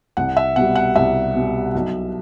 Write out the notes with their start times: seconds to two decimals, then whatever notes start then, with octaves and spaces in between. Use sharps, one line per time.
0.17 C2 F#5
0.37 E5
0.56 B2 G3 F#5
0.76 F#5
0.96 C2 E5
1.35 B2 G3
1.75 B1